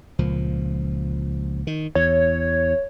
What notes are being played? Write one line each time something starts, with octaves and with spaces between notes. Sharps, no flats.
C#2 A#2 F3
D#3
E2 C#5